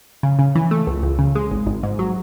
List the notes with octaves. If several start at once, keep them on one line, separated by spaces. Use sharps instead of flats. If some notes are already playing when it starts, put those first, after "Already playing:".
C#3
C#3
E3
A3
C#2
C#2
C#3
G#3
G#1
G#1
G#2
F#3